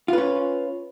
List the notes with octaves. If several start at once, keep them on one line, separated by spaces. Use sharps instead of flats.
C#4 F4 B4